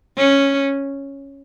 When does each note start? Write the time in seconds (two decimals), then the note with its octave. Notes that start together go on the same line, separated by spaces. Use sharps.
0.18 C#4